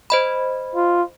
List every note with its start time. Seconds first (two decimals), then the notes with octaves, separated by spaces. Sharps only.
0.10 C5 D#5 B5
0.75 F4